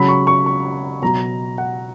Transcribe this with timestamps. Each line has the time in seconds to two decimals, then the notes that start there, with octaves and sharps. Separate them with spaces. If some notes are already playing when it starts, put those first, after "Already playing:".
Already playing: C#3 F#3 B5
0.08 C#6
0.27 C#6
0.46 C#6
1.02 B2 F#3 A#5
1.58 F#5